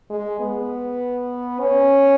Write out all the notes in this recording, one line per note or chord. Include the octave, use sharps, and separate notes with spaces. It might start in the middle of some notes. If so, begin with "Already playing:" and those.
G#3
B3
C#4